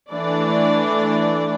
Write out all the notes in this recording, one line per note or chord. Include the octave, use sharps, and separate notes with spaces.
E3 A3 D4 D5